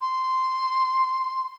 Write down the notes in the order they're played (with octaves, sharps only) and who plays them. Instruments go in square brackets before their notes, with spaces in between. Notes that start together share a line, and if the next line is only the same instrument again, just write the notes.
[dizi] C6